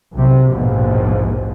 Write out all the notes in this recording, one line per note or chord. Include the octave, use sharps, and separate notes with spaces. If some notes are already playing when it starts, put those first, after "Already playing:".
B1 C3
A#1 D#2 G#2 B2 F3